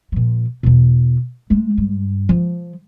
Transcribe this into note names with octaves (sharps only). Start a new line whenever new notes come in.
A#2 F3
E2 B2
G#3 A3
G2
F3